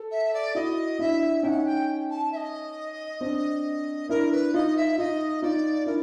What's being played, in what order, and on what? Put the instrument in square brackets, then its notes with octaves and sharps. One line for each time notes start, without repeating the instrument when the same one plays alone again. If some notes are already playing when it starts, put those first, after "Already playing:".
Already playing: [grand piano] A4
[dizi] E5
D5
[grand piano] E4 F#4 [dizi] D#5
[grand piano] D4 E4 [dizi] E5
[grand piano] C#4 D#4 [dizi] F#5 G5
[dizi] G5
A5
E5
D#5
[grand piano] C4 D4
[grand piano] D4 E4 [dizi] A#4
[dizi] B4
[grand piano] D#4 F4 [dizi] D#5
[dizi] E5
[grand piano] D#4 F4 [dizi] D#5
[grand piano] D#4 F4 [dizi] D5
[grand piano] D4 E4 [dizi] A#4